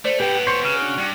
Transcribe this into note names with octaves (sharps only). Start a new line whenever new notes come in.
A3 C5 D5
A2 B3 G4 B4
C5 C#5
C#3 F#4 F6
D4
G2